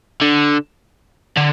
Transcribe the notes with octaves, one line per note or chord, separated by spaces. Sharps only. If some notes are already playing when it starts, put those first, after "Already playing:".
D3
D3